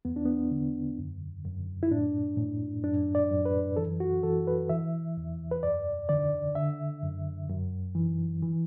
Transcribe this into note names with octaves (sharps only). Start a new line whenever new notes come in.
E2 B3
D4
B3
D3
F#2
F#2
E4
A2 D4
A2
F#2 D4
D5
F#2
B4
E3 A4
F#4
E3 A4
B4
E3 E5
E2
B4
F#2 D5
D3 D5
D3 E5
F#2
F#2
E3
E3